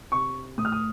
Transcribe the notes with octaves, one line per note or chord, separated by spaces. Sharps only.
C3 C#6
A2 D#6
F6
D#6